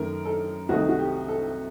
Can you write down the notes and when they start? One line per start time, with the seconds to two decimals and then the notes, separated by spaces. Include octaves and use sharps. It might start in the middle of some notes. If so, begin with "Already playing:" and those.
Already playing: F#2 D#3 A3 A#4
0.25 A4
0.69 C2 C3 D#3 A3 D#4 F#4
0.89 F#4
0.98 G4
1.28 A4